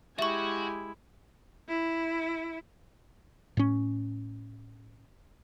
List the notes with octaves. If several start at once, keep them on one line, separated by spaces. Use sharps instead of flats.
G#3 E4 F#4 G4 E5 G#5 C#6
E4
A2 C#4